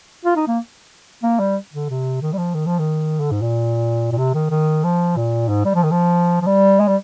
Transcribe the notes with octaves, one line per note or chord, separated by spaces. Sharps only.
F4
D#4
A#3
A#3
G3
D3
C3
D#3
G3
F3
D#3
F3
D#3
D3
G#2
A#2
A#2
C3
D#3
D#3
F3
A#2
G#2
G3
F3
D#3
F3
F3
G3
G#3
G3